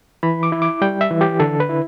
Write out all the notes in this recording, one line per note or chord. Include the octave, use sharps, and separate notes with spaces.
E3 B5
D6
E4
D6
G3 G5
E5
E3
G4
D3 A4
B4
E4